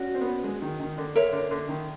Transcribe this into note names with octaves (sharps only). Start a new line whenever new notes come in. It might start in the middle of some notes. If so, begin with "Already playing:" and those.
Already playing: C#4 F#4 D5
C4
B3
G#3
D#3
D#3
D3
A#4 C#5 E5
D3
D3
D#3